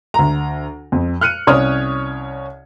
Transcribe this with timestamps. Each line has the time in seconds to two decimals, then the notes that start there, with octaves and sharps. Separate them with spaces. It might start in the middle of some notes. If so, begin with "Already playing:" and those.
0.14 D2 A#5
0.92 F2
1.21 F6 F#6 C#7 D#7
1.47 C2 C#4 C#5 D5 D#6 F6